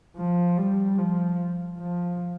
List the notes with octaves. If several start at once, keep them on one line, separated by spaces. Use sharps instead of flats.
F3
G3
F3
F3